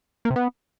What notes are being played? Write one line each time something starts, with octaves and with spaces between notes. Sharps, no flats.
A#3
C3
B3